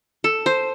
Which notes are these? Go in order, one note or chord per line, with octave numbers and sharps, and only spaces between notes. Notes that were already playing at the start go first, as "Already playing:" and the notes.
A4
C5